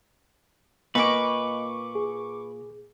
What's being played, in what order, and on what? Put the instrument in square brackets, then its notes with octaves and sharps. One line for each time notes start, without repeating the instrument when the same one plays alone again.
[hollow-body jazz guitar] A#2 A#3 [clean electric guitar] B4 [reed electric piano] D#5 [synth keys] C#6 D6
[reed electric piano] G#4